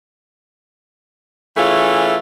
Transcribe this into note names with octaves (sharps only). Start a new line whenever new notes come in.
E3 A3 C#4 F4 G#4